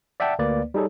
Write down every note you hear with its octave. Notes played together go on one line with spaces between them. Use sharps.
D5 E5 F#5 G5 A5
D2 A#3 B4 D5
G3 D#4 G#4 A4 C#5